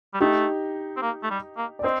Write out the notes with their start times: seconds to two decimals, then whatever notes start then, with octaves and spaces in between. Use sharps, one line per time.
0.14 G3
0.20 A3 D#4 G4
0.97 C4
1.02 A#3
1.23 A3
1.30 G3
1.57 A#3
1.79 D5
1.83 C4 C5 D#5